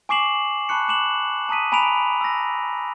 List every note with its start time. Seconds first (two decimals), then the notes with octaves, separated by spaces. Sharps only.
0.09 G#5 C#6 D6 C7 E7 F#7
0.69 A5 B5 C#6 F#6 C#7
0.88 D6 E7 F#7
1.49 A5 A#5 D#6 B6 D#7
1.72 G#5 A#5 B5 B6 D7 F7
2.21 E6 A#6